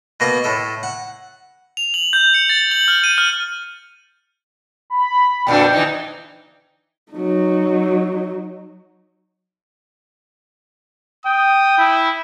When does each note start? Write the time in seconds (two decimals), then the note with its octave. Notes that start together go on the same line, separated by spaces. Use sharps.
0.20 B2 A#3 D#5
0.44 A2 A4
0.83 F#5
1.77 F7
1.94 F#7
2.13 G6
2.34 C#7
2.49 A6
2.71 F#7
2.88 F6
3.04 D#7
3.18 F6
4.90 B5
5.47 F2 A#2 D4 G5
5.73 E3 D#4
7.12 F#3 D#4
11.26 G5 D#6
11.78 E4